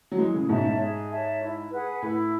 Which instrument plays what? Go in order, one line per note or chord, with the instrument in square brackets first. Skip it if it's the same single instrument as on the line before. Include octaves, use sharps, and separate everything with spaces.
[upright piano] F#3
[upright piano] E3 G#3 [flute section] G#4
[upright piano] A2 C#3
[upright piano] G#2 B2 [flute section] C#5 E5 A5
[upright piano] G#2
[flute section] G#4
C#5 E5 A5
E4
G#4 B4 F#5
[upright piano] A2 [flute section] E4